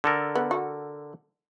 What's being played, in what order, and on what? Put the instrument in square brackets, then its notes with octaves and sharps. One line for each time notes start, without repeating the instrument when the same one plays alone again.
[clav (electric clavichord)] D3 A4 A#4
[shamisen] B3
F#4